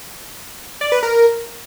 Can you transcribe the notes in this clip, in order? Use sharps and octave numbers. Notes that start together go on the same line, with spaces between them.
D5
B4
A#4